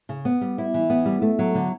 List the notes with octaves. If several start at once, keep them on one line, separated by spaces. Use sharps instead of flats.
C#3
B3
G3
E4
E3
B3
G3
A3
F#3
D3